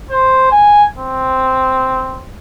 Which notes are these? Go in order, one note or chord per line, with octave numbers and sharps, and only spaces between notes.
C5
G#5
C4